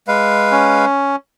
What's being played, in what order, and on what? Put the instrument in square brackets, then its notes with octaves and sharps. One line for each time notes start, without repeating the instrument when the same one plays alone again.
[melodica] G#3 B4 F5
[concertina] C#4